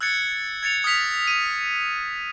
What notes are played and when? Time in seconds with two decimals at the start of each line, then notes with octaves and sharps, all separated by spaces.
0.01 E6 F#6 G#6 A6 C#7
0.63 G#6 A6 C#7 F7
0.84 D#6 F6 B6 F7
1.27 D#7